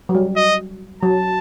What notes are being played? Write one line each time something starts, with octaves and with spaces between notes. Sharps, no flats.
F#3
G3
D#5
F#3 A5